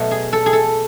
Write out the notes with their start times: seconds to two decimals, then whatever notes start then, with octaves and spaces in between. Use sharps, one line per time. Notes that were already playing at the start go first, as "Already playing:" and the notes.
Already playing: B2 F#3 A3
0.11 G#4
0.33 A4
0.46 G#4
0.53 A4